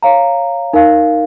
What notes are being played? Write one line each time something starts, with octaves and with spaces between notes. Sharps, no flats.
C#5 F5 A#5
D#4 A#4 F5